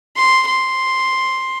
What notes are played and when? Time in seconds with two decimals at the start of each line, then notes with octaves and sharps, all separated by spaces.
0.17 C6
0.48 C6